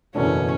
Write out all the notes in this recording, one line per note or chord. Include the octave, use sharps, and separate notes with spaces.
F#1 E2 B2 A3 C#4 D4